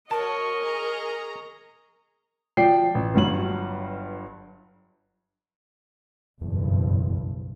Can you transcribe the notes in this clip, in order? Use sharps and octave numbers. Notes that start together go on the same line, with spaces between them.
F#4 A#4 C#5 D#5 A5 C#6
G#4 A#5
F3 D5 G5 C7
A1
G1 G2 F#3 F#7
F#1 B1 E2 G2